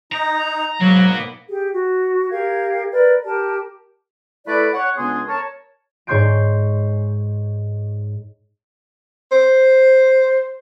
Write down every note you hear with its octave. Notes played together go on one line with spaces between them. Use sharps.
D#4 A#5
G#2 F#3 A#3 B3 F#4
G4 G#4
F#4
G4 A#4 F5 G#6
A#4 B4 D5
G4 A#4 A5
A3 E4 A4 B4 D5
C#5 F#5
C#2 B3 D4 G#4 G#5 C6
A#4 C#5 A5
G#2 C#5 C6 G6 D7
C5